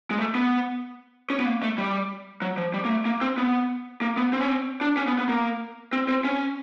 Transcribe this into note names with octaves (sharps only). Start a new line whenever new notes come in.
G#3
A3
B3
C#4
B3
A#3
A3
G3
F#3
F3
G3
A#3
A3
A#3
C4
B3
A#3
B3
C4
C#4
C4
D4
C#4
B3
B3
A#3
C4
C4
C#4